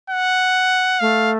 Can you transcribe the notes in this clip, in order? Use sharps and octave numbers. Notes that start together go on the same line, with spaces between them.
F#5
A3 F5